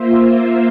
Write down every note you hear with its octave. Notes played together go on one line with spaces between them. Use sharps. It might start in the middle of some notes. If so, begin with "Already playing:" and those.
Already playing: A#3 F4 C5 E5